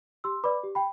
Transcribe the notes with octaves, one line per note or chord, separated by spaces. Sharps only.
G4 C6 E6
B4 D5 B5 D6
G4
G5 B5